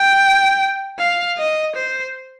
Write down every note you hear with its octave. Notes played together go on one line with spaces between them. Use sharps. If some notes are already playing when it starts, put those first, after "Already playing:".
Already playing: G5
F5
D#5
C5